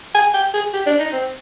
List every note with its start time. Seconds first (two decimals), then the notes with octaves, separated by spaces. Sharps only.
0.15 G#5
0.34 G5
0.54 G#4
0.73 G4
0.86 D4
0.99 D#4
1.13 C4